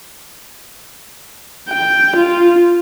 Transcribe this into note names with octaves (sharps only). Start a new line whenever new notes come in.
G5
F4